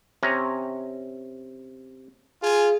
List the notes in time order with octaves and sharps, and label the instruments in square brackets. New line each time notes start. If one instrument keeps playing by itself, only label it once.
[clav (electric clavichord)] C3 C#4 A#5
[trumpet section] F4 G#5 [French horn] G#4